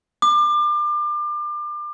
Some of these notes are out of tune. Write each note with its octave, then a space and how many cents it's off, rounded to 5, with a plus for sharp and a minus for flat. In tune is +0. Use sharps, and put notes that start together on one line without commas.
D6 +30